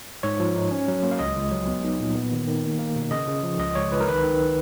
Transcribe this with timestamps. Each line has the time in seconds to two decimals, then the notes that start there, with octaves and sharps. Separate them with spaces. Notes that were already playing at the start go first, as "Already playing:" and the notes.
0.23 G#2 C#5
0.40 F3
0.56 D#4
0.71 C#4
0.88 F#3
1.03 A#3
1.11 F5
1.19 C#2 D#5
1.36 C#2
1.51 F#3
1.68 B3
1.84 D#4
2.00 A#2
2.15 B3
2.32 D#3
2.47 D#3
2.64 A#3
2.79 A#3
2.96 B2
3.11 C#3 D#5
3.28 C#3
3.43 F3
3.59 C#2 D#5
3.75 C#2 C#5
3.92 C#2 B4
4.00 A#4
4.08 D#3 B4
4.23 D#3